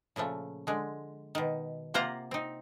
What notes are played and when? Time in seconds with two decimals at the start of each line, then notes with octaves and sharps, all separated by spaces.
0.16 A#2 C#3 F3 A3
0.67 D3 G#3
1.35 B2 D#3
1.94 C3 A#3 F4 C5 F#5 A#5
2.31 C4 D#4